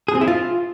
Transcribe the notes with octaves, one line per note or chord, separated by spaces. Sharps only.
G#4
C4
E4
F4